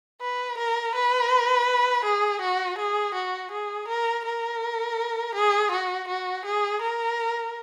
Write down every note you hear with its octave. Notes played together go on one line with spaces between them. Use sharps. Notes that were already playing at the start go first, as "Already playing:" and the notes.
B4
A#4
B4
G#4
F#4
G#4
F#4
G#4
A#4
A#4
G#4
F#4
F#4
G#4
A#4